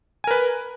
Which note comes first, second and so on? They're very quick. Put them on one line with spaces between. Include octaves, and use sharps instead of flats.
G#5 A#4 B4